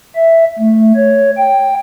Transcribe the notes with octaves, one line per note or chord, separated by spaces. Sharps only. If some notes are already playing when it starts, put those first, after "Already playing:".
E5
A3
C#5
G5